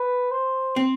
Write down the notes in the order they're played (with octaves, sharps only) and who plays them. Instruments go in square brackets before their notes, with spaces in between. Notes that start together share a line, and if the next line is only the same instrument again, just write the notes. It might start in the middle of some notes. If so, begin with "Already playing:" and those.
Already playing: [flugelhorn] B4
C5
[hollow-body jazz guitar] C4